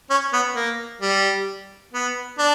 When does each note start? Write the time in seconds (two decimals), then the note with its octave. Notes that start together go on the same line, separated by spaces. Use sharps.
0.10 C#4
0.33 B3
0.55 A#3
1.01 G3
1.93 B3
2.39 D4